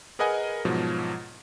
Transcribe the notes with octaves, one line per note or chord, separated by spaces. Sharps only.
G#4 A#4 B4 D#5 F#5 G#5
G#2 B2 F3 F#3